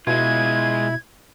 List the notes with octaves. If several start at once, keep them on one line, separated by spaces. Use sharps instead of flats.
B2 G#3 E4 F4 G#6